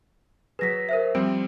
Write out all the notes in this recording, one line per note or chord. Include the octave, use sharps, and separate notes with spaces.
F#3 G#4 B4 A#6 B6
A#4 C5 E5
F3 G3 C4 D7